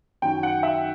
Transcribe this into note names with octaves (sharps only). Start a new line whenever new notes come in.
F#2 D#3 F#3 G5
F#5
E5